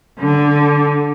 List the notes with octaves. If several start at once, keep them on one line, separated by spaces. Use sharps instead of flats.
D3